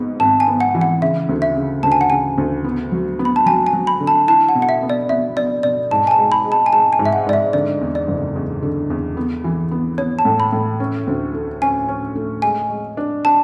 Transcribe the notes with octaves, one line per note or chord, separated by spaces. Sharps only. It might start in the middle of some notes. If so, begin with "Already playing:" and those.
Already playing: G#1 G#2 B3
G#1 A5
G#5
B3
F#5
E3
F#5
C#3 E5
D2
E5
C#3
D2 A5
G#5
F#5
C#3 G#5
D2
B3
F#3
B3
B5
A5
F#3 G#5
G#5
F#3
B5
D3
A5
E4 A5
F#5
B2
F#5
E5
B3
D5
B3 E5
B3 D5
B2 D5
G#2 A5
G#5
A5
G#3
B5
G#3
A5
G#5
G#3 A5
G#5
G#2
E5
F#5
G#2 D5
E5
D3 D5
E2
D5
F#1
E2
D3
E2
B3
E3
B3
B3 C#5
A5
A2
B5
A2
C#4
D2
A3
C#4 G#5
C#4
A3
G#3 G#5
G#3
D4
D4 A5